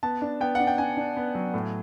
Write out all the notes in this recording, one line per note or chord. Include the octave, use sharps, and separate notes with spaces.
B3 A5
D4
B3 G5
D4 F#5
G5
D4 G#5
D4
B3
F#3
A2